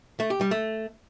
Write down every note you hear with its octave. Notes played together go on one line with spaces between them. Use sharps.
A3
G4
G3
A3